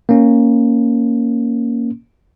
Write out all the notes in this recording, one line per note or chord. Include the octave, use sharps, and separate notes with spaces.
A#3 C#4